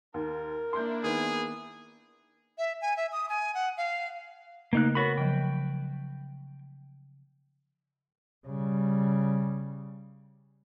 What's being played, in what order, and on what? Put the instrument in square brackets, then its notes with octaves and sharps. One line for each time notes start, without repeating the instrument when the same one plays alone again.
[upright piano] D#2 [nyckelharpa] A#4
[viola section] A#3 D4 E4 [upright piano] C6 G6
[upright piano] D#3 B3 [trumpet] G#4
[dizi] E5
G#5
E5
D#6
G#5
F#5
F5
[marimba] C#3 A3 [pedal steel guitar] A#3 D#4 F#6
[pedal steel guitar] B3 F#4 B5 [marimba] A#4 C#5 F#5
[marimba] C#3 F3 F#3 [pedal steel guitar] G5
[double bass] C#3 G3